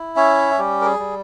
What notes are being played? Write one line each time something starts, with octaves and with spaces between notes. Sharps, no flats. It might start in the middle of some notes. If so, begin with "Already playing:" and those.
Already playing: E4
C#4 C#5 E5
G3 G4
A#4
G#4
G3